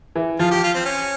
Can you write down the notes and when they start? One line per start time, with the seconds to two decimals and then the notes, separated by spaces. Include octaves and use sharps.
0.16 E3
0.39 F3 F4
0.51 G4
0.63 F4
0.74 C4
0.85 C#4